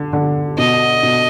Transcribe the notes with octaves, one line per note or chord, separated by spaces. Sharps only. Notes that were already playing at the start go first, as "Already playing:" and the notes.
Already playing: D3
D3
B2 D#5
B2